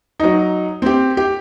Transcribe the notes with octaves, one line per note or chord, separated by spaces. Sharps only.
F#3 D#4
C4 G4
G4